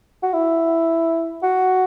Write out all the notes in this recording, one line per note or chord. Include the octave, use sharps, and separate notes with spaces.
F#4
E4
F#4